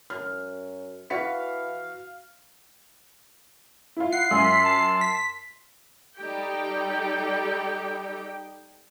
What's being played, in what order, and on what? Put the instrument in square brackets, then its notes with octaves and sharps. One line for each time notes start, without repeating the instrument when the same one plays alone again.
[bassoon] F#2 [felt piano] F6
[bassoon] E3 [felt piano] F#4 B6 C#7 [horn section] F5
[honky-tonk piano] E4 F4
[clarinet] F#5 [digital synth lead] C7
[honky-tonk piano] F#2 [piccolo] G#5 [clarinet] C6
[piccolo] B6
A5
[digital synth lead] B6
[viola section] G3 D#4 G4 A4 G5